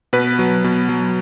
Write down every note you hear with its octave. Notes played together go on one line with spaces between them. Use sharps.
B2 B4
F#3
B2
F#3